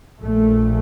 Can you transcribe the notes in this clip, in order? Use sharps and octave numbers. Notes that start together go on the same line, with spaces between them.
A#1 A#2 A3